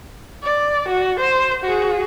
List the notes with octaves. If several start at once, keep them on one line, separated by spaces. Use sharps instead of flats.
D5
F#4
C5
F#4 G#4